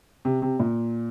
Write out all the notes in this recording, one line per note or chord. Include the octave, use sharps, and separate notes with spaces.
C3
C3
A#2